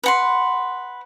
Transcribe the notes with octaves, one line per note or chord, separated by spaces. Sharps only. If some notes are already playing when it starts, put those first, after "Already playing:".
B4 F#5 C6